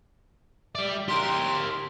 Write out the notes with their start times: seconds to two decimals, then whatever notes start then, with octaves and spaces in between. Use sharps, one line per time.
0.75 G3 D5 E5
1.09 G4 A#4 C6